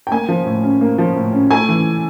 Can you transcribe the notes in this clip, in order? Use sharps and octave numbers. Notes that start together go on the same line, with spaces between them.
G5
A#3 G#5
F3
A2
C#4
A#3
F3
A2
C#4
A3 G#5
E3